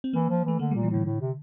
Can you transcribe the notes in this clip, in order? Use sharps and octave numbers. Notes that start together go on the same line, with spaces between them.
C4
E3 A#3
F3
E3 A3
D3 A#3
A#2 G3
E3
A2 D3
A2
C3